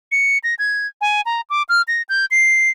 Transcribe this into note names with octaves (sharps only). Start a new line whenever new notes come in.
C#7
A#6
G#6
G#5
A#5
D6
F6
A#6
G6
C7